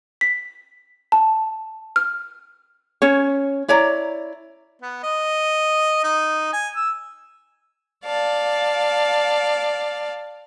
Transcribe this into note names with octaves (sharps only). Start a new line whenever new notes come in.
B6
A5
F6
C#4 C#5
E4 C#5 D5 A#5
B3
D#5
D#4
G#5
E6
D5 F5 A5